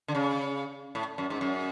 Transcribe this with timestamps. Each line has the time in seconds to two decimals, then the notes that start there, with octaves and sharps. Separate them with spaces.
0.08 D3
0.15 C#3
0.95 A2
1.18 F#2
1.30 G#2
1.41 F#2